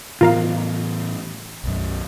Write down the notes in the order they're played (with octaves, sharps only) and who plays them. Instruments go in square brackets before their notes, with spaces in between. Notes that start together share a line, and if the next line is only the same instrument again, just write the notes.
[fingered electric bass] A2 E3 B3 [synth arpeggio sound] F4 A#4 F5
[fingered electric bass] B1 F#2